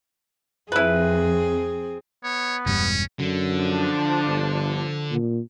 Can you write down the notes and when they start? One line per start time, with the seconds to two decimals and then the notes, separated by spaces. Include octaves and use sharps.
0.72 F2 C4 E4 G#4 B4
2.24 B3 C#5
2.66 E1 G2 C#4
3.19 F#2 D3
3.54 F3 D4
4.27 G1
5.11 A#2